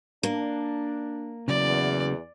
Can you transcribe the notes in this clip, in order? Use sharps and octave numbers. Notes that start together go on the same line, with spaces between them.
A#3 D4
E2 C#3 F#3 D5